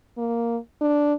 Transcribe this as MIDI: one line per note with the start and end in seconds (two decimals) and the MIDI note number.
0.18 0.58 58
0.81 1.14 62